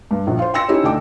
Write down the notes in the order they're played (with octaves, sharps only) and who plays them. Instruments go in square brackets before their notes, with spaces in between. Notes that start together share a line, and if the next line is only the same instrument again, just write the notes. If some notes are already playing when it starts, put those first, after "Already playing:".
[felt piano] G2
A#1
F4 C5
G5 C6 E6 A#6 C#7
C#4 D#4 E4 G4
D2 D4 D#5 G5 D6